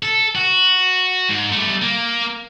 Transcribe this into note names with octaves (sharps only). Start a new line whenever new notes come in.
A4
F#4
G#2
G3 A3
A#3